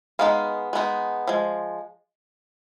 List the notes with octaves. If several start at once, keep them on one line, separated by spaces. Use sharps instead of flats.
G#3 B3 D#4 F5
G#3 B3 D#4
F3 G#3